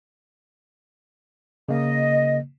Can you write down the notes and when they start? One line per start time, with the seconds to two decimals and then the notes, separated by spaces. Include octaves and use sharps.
1.69 C#3 A#3 D#5